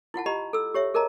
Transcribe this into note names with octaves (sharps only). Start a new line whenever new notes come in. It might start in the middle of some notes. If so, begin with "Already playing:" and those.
E4 F4 F#5 A5
G4 D#5 A#5 B5
A4 E6
G4 C#5 E5
G#4 A#4 D#5 A5 A#5